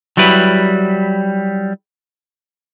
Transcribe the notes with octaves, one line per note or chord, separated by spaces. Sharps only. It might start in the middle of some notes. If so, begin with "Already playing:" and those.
F#3 G3 E4 B4